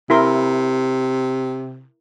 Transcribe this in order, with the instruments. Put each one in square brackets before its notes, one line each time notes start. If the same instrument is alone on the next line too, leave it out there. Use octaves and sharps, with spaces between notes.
[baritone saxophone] C3 [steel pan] E4 A#4 C6